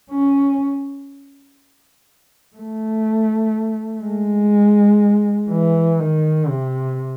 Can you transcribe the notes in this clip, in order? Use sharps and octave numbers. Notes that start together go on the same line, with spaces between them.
C#4
A3
G#3
E3
D#3
C3